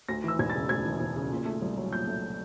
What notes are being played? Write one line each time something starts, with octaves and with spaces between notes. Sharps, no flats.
D2 A#6
E3 E6
E1 G#6
C#3 A6
D2 G#6
E3
E1
C#3
A#2
A3
C2
F#3
A#2 G6
A3